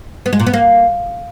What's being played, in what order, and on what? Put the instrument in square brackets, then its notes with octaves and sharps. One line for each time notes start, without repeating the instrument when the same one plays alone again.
[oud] B3
G#3
A#2
B3
A#3